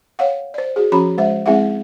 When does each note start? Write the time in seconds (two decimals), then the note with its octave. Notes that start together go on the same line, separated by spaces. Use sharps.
0.19 C#5 F5 F#5
0.54 C5 D5
0.76 F#4 G#4
0.92 F3 C#4 F#4 A#5 B5
1.18 G#3 C5 E5
1.46 G#3 C4 E4 G#4 E5 F#5